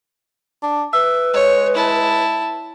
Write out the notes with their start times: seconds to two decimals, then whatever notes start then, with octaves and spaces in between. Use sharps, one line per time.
0.63 D4
0.93 B4 E5
1.34 G#3 C#5
1.74 E4 A5